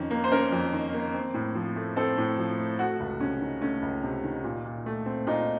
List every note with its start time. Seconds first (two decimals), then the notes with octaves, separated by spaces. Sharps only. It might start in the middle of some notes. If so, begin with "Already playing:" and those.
Already playing: F2 D#3 C#4
0.11 A#3
0.24 C5
0.32 C#4 A#4
0.52 F2
0.73 D#3
0.94 A#3
1.14 C4
1.34 A2
1.55 F3
1.76 A3
1.96 C4 A4
2.18 A2
2.38 F3
2.58 A3
2.79 A3 F#4
3.00 C#2
3.20 C3 C#4
3.41 D#3
3.61 A3 C#4
3.82 C#2
4.04 C3
4.24 D#3
4.44 A#2
4.65 A#2
4.86 A3
5.06 C4
5.27 A#2 D#4